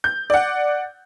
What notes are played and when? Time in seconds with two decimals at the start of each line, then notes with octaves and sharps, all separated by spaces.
0.04 G6
0.30 D5 F#5